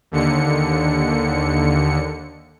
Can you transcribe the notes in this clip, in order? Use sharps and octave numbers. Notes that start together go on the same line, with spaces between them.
D#2 D3 C#7